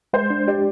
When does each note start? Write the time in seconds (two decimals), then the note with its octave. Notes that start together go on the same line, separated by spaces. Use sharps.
0.13 G#3 C5
0.30 D4
0.48 G4 D5